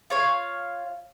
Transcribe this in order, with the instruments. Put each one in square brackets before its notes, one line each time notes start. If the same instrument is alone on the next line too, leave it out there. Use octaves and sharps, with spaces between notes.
[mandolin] F4 C#5 F5